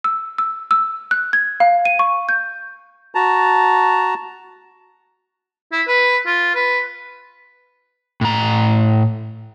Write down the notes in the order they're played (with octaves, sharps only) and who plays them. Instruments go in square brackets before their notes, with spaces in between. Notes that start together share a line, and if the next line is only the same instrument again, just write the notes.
[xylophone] E6
E6
E6
F#6
G#6
F5
D#7
C#6
G6
[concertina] F#4 A5 A#5
[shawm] E4
B4
F4
B4
[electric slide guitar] A2 A#5